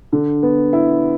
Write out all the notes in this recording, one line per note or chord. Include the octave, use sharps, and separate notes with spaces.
D3
B3
E4